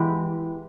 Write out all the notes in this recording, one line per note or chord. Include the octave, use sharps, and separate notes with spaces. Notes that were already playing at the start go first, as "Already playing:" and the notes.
Already playing: E3 G#3 B3 E4 G4